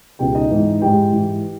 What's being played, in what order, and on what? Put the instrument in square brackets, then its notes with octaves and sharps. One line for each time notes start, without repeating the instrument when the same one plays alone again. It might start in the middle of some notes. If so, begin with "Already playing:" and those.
[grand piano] C#2 B2 G4 G5
D#4 D#5
G#2 E3
G#2 E3 G4 G5
G#2 E3